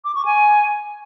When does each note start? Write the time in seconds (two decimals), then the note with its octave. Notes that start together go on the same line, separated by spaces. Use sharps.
0.04 D6
0.15 C#6
0.26 G#5